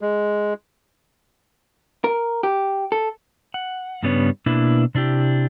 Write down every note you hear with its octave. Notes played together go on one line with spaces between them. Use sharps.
G#3
A#4
G4
A4
F#5
G2 C#3 G3 B3 D4 C#5
B2 A#3 D4 E4 B4
C3 D4 E4 G4